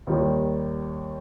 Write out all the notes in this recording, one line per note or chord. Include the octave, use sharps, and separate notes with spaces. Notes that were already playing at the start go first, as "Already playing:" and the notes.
D#2 D#3 G3